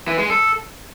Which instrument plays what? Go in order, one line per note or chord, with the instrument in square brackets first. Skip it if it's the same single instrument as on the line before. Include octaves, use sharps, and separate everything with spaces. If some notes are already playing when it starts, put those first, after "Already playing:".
[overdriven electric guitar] E3
G#3
A4